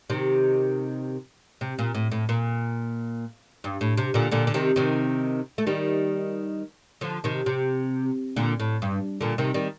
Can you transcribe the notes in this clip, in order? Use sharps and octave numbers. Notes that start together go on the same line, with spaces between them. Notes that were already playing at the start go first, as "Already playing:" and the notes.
C3 D#3
C3
A#2
A2
A2
A#2
G2
A2
C3
A#2 D3
A#2 D3
D3
C3 D#3
C3 D#3
A3
D#3 G3
D3 F3
C3 D#3
C3
A#2 D3
A2
G2
A#2 D3
C3 D#3
D#3 G3